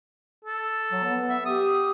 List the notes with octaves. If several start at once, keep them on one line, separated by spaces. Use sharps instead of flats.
A4
F#3
B3
E5
G4 D#6